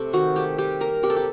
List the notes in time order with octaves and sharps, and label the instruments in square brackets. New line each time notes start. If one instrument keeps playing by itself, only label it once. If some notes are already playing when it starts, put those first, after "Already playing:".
Already playing: [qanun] C3 A3 A4
D#3 F#4
A3 G4
G3 G4
A#3 A#4
C3 G4
A4
G4